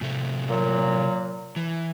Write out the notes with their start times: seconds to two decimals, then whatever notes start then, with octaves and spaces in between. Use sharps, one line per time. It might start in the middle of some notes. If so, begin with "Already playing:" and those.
0.01 A2 C3 A3
0.48 A#2 F#3
1.56 E3